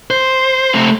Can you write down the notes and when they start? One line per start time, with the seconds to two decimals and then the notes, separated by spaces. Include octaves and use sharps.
0.10 C5
0.74 A3 C4